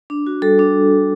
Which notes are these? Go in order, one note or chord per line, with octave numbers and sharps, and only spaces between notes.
D4
F#4
G3 A4
D4